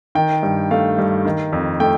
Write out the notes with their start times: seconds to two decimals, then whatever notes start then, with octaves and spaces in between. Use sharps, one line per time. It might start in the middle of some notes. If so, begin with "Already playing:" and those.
0.15 D#3 G5
0.43 G2
0.71 A3 F5
0.98 G2
1.25 D#3
1.53 F2
1.80 A3 G5